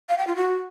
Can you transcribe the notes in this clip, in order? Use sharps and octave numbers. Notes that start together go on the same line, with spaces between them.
F5
G5
F4
F#4